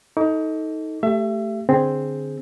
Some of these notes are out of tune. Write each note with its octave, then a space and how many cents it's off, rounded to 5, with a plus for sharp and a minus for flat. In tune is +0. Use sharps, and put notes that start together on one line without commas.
D#4 +25 A4 +0 D6 -40
A3 +0 G4 +0 E5 +30
D3 +0 C4 +0 G#4 +0